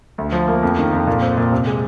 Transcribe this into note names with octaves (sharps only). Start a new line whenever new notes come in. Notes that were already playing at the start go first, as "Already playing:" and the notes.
D2
F3
A#3
F2
D#3
F2
A#2
C4
A#2
C3
G#3